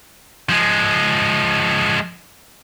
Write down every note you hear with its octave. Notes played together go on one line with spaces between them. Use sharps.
F3 G#3